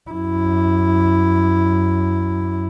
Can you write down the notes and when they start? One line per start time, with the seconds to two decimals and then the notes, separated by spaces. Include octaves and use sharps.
0.11 F#2 E4